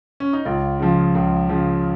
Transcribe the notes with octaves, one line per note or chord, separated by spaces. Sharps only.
C#4
D#4
C#2 F4
C#3 F3
C#2
C#3 F3